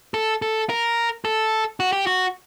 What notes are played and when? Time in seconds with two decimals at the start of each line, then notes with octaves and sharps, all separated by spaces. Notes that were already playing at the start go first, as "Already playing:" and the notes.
0.14 A4
0.42 A4
0.69 A#4
1.25 A4
1.80 F#4
1.93 G4
2.07 F#4